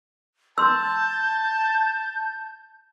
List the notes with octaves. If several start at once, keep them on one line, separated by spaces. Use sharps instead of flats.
A5 C6 E6 G6